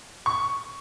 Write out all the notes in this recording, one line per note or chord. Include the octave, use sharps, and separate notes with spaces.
C#6